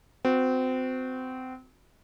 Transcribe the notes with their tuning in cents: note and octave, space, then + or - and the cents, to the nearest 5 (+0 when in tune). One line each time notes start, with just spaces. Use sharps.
C4 -25 F#4 -25